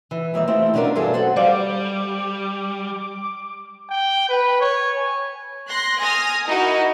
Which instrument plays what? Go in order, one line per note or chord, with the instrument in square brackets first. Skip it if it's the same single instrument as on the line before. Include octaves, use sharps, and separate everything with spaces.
[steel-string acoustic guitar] E3
D#2 E3 G#3 E5
A3 C4 E4 F4 G4
B2 C#4 D4 F4 A#4
G2 E3 F#3 F4 G#4 A4
F#4 A4 C5 F#5
[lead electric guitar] G3 [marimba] C5 D5 F5 [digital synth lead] D6
[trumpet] G5
B4
C#5
G#5
[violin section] C6 F#6 A#6
G#5 D#6 F6 A#6
D#4 E4 F#4 A#4